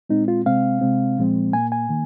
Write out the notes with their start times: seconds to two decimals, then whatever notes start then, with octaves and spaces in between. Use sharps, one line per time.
0.10 A#2 G#3 C4 D#4
0.28 F4
0.46 C3 G#3 C4 F5
0.81 C3 G#3 C4
1.18 A#2 F3 G#3 C4
1.53 A#2 A#3 G#5
1.72 G#5
1.89 D#3 A#3